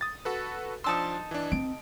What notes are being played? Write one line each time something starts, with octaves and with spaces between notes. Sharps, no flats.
D#6 A6
F#4 A4 B4
F3 D4 D#4 A5 C6 E6
E3 D4
C4 D7